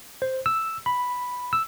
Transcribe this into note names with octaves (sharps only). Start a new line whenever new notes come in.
C5
E6
B5
E6